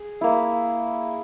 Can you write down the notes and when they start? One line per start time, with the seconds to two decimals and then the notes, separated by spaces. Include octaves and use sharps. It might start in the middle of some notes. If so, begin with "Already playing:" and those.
Already playing: G#4
0.21 A#3 E4